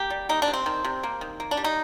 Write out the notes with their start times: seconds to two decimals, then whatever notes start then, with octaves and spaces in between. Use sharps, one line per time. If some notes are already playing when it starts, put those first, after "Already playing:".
Already playing: A#3 G4
0.10 G3
0.29 A#3 D#4
0.42 D4
0.48 C3
0.53 C4
0.66 D#3
0.85 C3
1.03 A#3
1.21 D#3
1.40 A#3
1.51 D4
1.57 G3
1.64 D#4